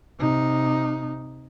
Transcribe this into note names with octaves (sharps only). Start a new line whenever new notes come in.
C3 D#4